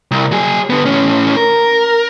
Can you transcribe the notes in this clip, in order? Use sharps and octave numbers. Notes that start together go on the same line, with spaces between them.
C2
F#3 G#4
D3 B3
A2 C#4
A#4